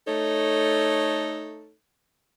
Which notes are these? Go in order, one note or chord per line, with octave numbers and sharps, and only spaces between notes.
A3 D#4 A4 C#5